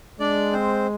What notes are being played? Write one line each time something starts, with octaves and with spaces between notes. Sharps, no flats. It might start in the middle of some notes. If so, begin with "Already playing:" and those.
G#3 D4 D5
C4 C5